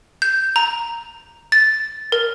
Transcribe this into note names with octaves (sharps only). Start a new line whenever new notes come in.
G6
A#5
A6
A#4